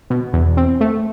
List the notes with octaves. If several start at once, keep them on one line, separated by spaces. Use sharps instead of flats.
B2
E2
C4
A3